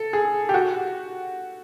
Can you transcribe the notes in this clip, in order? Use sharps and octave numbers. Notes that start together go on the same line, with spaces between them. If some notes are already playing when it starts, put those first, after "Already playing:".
Already playing: A4
G#4
G4
F#4